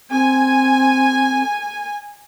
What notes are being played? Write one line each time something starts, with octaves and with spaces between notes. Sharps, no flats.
C4 G#5